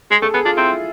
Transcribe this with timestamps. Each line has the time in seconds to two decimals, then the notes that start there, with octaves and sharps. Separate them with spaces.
0.11 G#3 G#4
0.22 A3 A4
0.34 B3 G#4
0.45 D4 F4
0.57 C4 E4